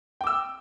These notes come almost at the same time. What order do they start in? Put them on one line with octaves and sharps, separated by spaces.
G5 D6 E6